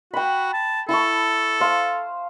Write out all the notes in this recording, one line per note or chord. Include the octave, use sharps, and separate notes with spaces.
F#4 G5 B5
A5
E4 A4 A5 C#6
C5 F5